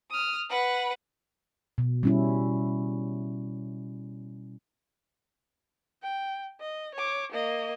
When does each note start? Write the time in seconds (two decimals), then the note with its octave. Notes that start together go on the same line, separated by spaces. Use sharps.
0.11 D#6 F6
0.50 B4 F#5
1.78 B2
2.03 G3 C#4 E4
6.03 G5
6.61 D#5
6.94 C#5 D6
7.32 A#3 D#5